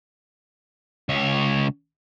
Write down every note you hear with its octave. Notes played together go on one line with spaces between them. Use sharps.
C#2 C#5